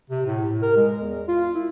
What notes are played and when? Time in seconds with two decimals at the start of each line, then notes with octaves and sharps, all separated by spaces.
0.10 C3
0.26 A2
0.40 A2
0.62 A#4
0.77 G#3
0.97 E2
1.28 F4
1.55 E4